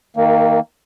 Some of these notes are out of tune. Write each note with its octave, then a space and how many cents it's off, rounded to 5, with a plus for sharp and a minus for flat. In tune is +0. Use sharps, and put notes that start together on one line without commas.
D#3 +15 A#3 -15